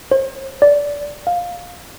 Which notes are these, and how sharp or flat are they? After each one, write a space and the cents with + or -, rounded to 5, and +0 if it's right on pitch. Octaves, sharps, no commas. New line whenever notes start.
C5 +40
D5 -20
F5 +10